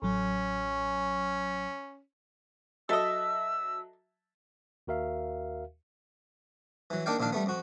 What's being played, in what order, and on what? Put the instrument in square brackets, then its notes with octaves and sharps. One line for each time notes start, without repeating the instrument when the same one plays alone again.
[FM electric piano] A1 F#3 [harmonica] C#4
[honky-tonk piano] F#3 E5 A5 [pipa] A4 D#5 [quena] E6
[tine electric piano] D#2 F#4 A#4 E5 F5
[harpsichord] E3 F#3
A#3 D4 D#4 D5 F5 G5
A#1 A#2 D#3 D4 F5
G3 A3 B3
F2 F#4